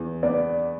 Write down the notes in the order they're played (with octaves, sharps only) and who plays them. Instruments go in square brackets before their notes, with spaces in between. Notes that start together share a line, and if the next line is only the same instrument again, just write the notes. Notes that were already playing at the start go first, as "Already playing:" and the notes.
Already playing: [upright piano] E2
[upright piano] B3 [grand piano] D5